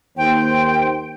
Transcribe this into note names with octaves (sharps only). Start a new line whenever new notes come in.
D#2 C5 G5